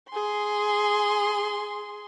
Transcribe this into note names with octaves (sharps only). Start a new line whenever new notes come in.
G#4 C6